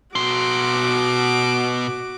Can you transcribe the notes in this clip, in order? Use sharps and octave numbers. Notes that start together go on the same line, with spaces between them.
B2 F#4 C6 D6